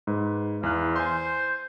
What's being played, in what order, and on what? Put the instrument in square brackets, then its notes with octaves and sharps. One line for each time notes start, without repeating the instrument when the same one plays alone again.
[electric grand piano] G#2 B4
[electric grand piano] E2 E4 F#6 [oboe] F5
[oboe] C5 [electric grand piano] G#5 C6